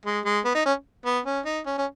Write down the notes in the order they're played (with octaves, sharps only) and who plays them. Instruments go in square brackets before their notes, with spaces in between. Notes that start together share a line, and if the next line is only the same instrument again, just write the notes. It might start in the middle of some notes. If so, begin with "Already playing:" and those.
[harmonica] G#3
G#3
B3
D#4
C#4
B3
C#4
D#4
C#4
C#4